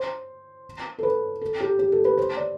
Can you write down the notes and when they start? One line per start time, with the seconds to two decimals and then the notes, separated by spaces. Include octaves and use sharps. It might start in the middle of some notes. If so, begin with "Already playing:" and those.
Already playing: C5
0.99 A4
1.03 B4
1.41 A4
1.61 G4
1.79 G4
1.92 A4
2.05 B4
2.17 C5
2.37 D5